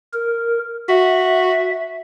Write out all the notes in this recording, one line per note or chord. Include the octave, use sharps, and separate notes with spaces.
A#4
F#4 E5